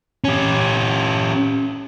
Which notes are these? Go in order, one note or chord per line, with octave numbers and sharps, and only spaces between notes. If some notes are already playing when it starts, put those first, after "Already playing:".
C#4 G4